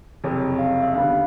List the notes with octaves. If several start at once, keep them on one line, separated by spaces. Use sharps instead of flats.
F#1 F2 C3 C#5
F5
E5
D#2 D3 G3 B3 F5